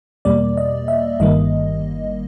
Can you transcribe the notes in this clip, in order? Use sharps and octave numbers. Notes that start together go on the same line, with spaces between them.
E2 B2 G3 A#3 D5
D#5
E5
G1 G2 D#3 G3 A#3 D#5